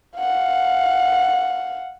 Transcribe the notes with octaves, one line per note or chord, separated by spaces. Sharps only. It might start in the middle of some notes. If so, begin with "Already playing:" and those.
F5 F#5